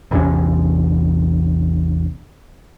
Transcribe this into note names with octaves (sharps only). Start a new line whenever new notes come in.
A1 E2 C3 C#4